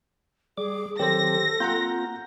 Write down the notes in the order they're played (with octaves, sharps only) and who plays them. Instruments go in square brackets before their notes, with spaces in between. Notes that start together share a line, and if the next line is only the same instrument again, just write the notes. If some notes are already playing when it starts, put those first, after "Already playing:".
[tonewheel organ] G3 D6 [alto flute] G#4
[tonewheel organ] D#3 F#3 C4 [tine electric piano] G4 C5 [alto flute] A4 [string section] A#6
[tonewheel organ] A#3 C4 F4 [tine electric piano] F#5 A#5 G6